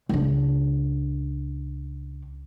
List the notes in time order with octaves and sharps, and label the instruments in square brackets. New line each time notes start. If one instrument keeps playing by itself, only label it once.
[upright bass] C#2 D4